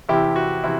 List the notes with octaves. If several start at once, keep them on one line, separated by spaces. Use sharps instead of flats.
E2 C3 E3 E4 G4
F#4
C3 E3 E4